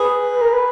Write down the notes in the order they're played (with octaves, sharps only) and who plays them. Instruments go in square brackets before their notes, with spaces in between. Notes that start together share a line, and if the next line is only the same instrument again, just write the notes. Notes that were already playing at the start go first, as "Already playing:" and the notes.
Already playing: [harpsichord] G#4 [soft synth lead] B4
[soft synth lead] B4
A#4
B4